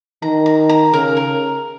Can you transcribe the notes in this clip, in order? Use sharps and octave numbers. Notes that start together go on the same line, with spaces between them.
D#3 A#5
A#5
A#5
C#3 A#4
A#4